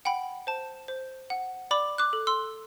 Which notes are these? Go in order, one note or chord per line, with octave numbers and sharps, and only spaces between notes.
F#5 G5 B5
C5 A5
C5
F#5
D5 B5 D6
D6 F#6
A4
C6 E6